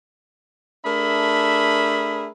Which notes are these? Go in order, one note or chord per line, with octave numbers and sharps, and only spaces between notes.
A3 D4 G#4 A#4 E5 B5